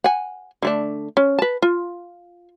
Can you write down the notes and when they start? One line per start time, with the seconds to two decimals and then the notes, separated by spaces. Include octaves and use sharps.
0.04 F#5 G#5
0.62 D3 A3 D4
1.17 C#4
1.39 B4 A5
1.62 F4